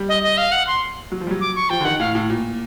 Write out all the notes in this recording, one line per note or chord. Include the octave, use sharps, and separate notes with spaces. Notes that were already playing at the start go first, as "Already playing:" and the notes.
Already playing: G3
D#5
D#5
F5
F#5
C6
F#3
F3
G3
F#3
D6
C#6
F3 G5
D3
D#3 F#5
A2 F5
A2
A#2